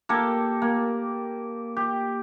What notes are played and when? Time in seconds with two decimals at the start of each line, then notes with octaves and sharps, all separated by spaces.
0.09 A#3 G4 A4
0.62 A#3
1.76 G4